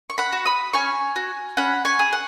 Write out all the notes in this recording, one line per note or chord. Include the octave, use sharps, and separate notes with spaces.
C#6
F#5 B5
F#4
B5 D#6
C#4 G#5 C#6
F#4
C#4 F#5 B5
G#5 C#6
G#4
F#5